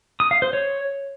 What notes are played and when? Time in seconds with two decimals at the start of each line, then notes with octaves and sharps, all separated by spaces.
0.20 D#6
0.31 F5
0.42 C5
0.53 C#5